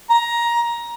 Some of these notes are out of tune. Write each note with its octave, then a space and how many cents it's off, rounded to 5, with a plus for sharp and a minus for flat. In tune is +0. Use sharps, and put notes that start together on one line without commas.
A#5 +15